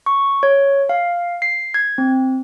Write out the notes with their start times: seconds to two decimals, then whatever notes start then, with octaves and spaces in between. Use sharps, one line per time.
0.06 C#6
0.43 C#5
0.89 F5
1.42 C7
1.74 G#6
1.98 C4